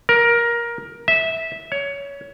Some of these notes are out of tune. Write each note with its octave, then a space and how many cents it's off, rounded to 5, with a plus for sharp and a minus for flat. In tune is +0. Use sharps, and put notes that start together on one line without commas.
A#4 +15
E5 -15
C#5 +20